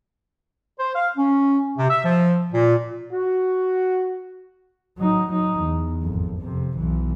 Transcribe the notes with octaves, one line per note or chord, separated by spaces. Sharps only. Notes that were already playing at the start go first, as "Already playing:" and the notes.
C5
F5
C#4
C3
E5
F3
A#2
F#4
F#3 D#4
F#3 D#4
E2
G#1 F2
F2 C3
B1 E3